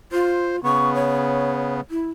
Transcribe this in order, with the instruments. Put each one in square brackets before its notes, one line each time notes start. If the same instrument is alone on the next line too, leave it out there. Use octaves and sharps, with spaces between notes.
[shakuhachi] F4 [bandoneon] C5
[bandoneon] C#3 B3 [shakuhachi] C#6
[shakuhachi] C#5
E4